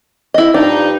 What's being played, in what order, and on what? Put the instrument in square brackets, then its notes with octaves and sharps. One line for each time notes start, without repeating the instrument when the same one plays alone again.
[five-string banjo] E4 D#5
[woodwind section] G2 F3 D#4 [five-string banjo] D4